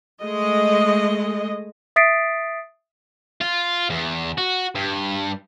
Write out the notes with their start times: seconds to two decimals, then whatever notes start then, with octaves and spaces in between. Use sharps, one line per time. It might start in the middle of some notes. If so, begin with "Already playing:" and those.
0.23 G#3 A3 D#5
1.96 E5 D#6 A6 B6 C7 D7
3.41 F4
3.90 E2
4.38 F#4
4.75 G2